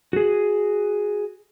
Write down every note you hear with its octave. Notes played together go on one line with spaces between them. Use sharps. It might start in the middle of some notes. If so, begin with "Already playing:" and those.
F#4 G#4